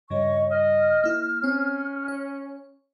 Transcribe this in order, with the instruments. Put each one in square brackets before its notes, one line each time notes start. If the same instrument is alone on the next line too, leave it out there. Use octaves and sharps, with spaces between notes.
[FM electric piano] G2 C#3 G3 [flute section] C#5 D#5 C#6
[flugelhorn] D#5 [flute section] F6
[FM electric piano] A#3 E4
[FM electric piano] C4 [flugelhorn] C#4
[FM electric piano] C#5